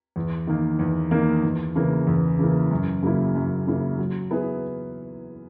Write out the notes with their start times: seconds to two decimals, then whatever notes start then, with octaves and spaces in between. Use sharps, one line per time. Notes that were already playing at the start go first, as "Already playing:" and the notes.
0.16 E2
0.47 D#3 A#3
0.79 E2
1.11 D#3 A#3
1.43 E2
1.75 C#3 E3 A#3
2.07 E2
2.39 C#3 E3 A#3
2.71 F#2
3.02 C#3 F#3 A#3 E4
3.35 F#2
3.67 C#3 F#3 A#3 E4
3.98 F#3
4.31 B3 E4 G#4 B4